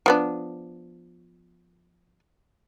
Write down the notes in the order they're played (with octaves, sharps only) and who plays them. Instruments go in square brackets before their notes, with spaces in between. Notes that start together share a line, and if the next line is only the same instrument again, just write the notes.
[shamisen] F3 B3 D4